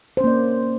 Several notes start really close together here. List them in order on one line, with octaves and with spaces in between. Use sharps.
C5 C#4 A#3 D5